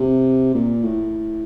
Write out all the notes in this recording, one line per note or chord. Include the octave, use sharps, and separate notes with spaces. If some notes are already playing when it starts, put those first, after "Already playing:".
Already playing: C3
A#2
A2